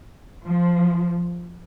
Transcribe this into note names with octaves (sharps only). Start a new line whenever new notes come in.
F3